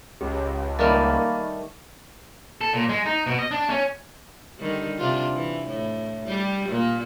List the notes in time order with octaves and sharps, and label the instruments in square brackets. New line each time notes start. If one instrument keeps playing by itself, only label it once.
[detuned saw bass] C#2 [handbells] G4
[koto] D#3 G3 A3 [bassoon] A#3 [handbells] B5 F6 A6
[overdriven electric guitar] A4
A#2
G#3
D#4
B2
D#5
D4
C#4
[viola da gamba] D3 D#3 G3
C3 D4 F4
E3
A2
G3 G4
A#2 A#3